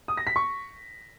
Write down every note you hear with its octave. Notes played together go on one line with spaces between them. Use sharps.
D#6
A#6
B6
C#6